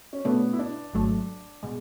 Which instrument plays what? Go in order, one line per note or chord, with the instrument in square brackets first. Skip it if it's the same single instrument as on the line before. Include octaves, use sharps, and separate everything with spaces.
[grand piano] C#4
[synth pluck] B2 A3 D4 [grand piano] B3
[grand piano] E4
D4
[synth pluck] G#1 G#2 F#3 A3
B2 G#3